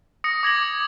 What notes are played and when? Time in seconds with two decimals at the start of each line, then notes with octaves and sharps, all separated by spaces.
0.24 D#6 A#6 C#7
0.43 D6 G#6 A#6 F#7